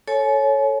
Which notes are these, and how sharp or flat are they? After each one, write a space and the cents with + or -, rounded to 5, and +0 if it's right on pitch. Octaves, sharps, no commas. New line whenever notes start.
A4 +0 C#5 +0 G#5 +40